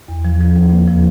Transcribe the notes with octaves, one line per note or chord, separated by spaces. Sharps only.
E2
F3
F3
D#2
A#3
F3